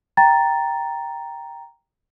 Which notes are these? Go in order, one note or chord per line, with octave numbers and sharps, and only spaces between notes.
G5 A#5 A6